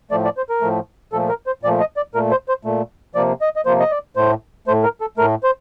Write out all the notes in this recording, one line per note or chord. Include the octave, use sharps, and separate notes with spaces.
A2 F3 A3 D5
D5
C5
A#4
A2 F3 A3
A#2 F3 A3 A4
A#4
C5
A#2 F3 A3 D5
D#5
D5
A#2 A3 A#4
C5
C5
A#2 A3
C3 F3 A#3 D5
D#5
D#5
C3 F3 A#3 C5
D#5
D5
A2 A3 C5
A2 A3 C5
A#4
A4
A2 A3 A#4
C5